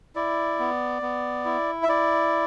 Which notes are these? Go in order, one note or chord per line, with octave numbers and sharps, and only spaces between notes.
E4 D5
B3
B3
E4
E5
E4 D5